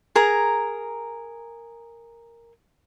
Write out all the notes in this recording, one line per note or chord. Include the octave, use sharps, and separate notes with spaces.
G#4 A#4 A#5